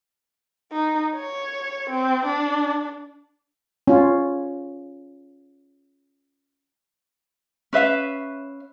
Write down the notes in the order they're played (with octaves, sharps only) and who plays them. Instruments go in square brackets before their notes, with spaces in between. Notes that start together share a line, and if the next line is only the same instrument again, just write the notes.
[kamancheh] D#4
C#5
C4
D4
[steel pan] C#4 F4
[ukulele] C#4 B4 E5 F5